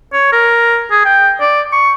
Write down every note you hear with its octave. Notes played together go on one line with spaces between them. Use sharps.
C#5
A#4
G#4
G5
D5
C#6